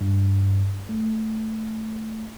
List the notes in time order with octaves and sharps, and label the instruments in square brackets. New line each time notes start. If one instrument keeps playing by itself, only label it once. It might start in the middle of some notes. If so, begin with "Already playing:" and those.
[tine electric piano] G2
A3